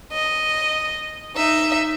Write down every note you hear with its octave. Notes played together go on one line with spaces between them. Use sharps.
D#5
D#4 E5